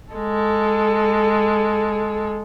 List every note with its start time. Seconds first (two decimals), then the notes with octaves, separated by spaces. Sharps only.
0.13 G#3 A4